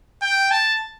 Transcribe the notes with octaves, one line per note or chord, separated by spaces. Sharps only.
G5
A5